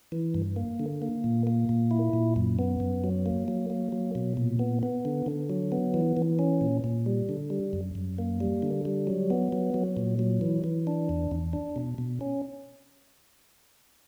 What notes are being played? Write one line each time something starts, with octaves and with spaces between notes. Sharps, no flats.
E3
G2
A#3
D3
A#3
A#2
A#3
A#2
E4
A#2
F#2
B3
F#2
F#3
A#3
F#3
A#3
F#3
B2
A#2
B3
B3
D3
D3
F#3
B3
E3
E3
C#4
A#2
A#2
G3
D3
G3
F#2
F#2
A#3
G3
D3
G3
F#3
B3
F#3
F#3
A#2
F#3
E3
E3
D4
E2
E2
D4
B2
B2
C#4